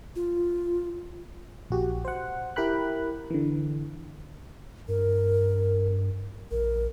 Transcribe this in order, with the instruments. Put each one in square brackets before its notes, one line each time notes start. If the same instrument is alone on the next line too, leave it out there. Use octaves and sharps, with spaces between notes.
[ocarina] F4
[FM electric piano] A#1 F#4 G4
C5 F#5
E4 G4 A#4 G5 B5 F#6
D3 E3
[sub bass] G2 [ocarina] A#4
[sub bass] A#1 [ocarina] A#4